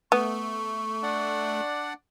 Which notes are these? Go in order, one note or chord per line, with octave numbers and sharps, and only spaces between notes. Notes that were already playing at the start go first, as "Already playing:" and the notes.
A3 B3 C#6
D4 D5 F#5